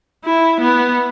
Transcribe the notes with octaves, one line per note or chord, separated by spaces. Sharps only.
E4
B3